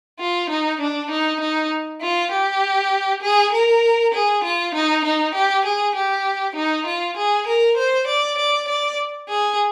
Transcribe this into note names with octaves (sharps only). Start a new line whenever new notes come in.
F4
D#4
D4
D#4
D#4
F4
G4
G#4
A#4
G#4
F4
D#4
D#4
G4
G#4
G4
D#4
F4
G#4
A#4
C5
D5
D5
D5
G#4